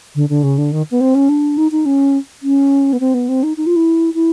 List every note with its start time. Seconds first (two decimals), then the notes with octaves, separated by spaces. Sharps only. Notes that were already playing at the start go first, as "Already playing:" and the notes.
0.15 D3
0.29 D3
0.43 C#3
0.58 D3
0.72 D#3
0.91 B3
1.00 C4
1.15 C#4
1.29 D4
1.57 D#4
1.71 D#4
1.86 C#4
2.43 C#4
2.93 B3
3.00 C4
3.14 B3
3.28 C4
3.43 D#4
3.57 D#4
3.66 F4
3.76 E4
4.14 E4